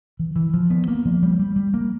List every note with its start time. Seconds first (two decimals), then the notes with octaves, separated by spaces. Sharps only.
0.19 E3
0.36 E3
0.54 F3
0.70 B3
0.88 A#3
1.05 F3
1.23 G3
1.39 G3
1.56 G3
1.74 A#3